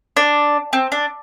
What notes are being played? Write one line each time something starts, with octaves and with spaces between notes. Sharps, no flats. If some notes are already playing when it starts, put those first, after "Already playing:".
D4
C4
D4